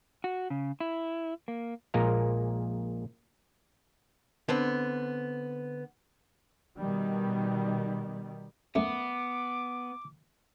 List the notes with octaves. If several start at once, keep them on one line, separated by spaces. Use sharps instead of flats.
F#4
C#3
E4
A#3
A#1 A#2 G#3 A#3 A#4 A#5
D3 B3 C4
B2 D#3 G3
F#2 A3 B3 D6